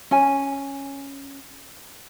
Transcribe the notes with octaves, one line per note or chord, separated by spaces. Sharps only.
C#4 G#5